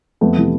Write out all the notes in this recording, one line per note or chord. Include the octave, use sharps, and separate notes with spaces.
F2 A3 B3
C3 E3